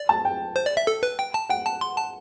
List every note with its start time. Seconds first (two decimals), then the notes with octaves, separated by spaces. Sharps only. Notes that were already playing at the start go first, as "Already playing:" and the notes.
Already playing: D5
0.09 A5
0.25 G5
0.56 C5
0.66 D5
0.77 E5
0.87 A4
1.03 B4
1.19 G5
1.34 A5
1.49 F#5 G5
1.66 A5
1.81 C6
1.97 A5